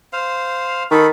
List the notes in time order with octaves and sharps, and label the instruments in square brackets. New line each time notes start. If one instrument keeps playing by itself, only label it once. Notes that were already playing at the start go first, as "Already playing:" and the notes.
[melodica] C5 F5
[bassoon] D#3 [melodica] A4 B5